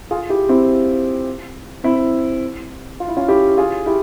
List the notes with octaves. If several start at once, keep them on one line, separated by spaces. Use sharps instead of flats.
F4 G#4
E4 G4
C4 E4
C4 E4
F4
E4
C#4 F4
E4 G4
F4 G#4
E4 G4